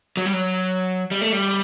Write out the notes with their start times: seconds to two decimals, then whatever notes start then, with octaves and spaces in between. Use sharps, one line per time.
0.17 F#3
0.26 G3
0.33 F#3
1.11 G3
1.21 A3
1.32 G3